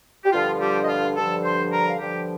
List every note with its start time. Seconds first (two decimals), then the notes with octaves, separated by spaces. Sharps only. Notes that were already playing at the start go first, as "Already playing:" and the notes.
0.24 G4
0.32 G2 D3 F3 F4
0.60 G3 G4
0.84 D#5
0.88 F4 F5
1.16 G2 D3 F3 A4 A5
1.44 C5 C6
1.72 A#4 A#5
1.89 F5
2.00 G2 D3 F3 G4 G5